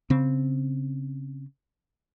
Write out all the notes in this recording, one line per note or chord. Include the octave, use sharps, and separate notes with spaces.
C#3 C4